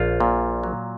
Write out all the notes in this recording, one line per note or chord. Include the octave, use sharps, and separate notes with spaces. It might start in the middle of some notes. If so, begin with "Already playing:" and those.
Already playing: A#1 F4
A#2
F#3